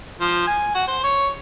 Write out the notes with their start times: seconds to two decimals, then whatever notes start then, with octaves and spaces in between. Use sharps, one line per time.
0.21 F3
0.47 G#5
0.75 F#4
0.87 C5
1.04 C#5